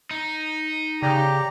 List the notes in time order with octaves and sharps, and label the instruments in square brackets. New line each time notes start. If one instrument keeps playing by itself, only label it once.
[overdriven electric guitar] D#4
[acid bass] C#3 [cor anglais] G4 [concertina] D5 A#5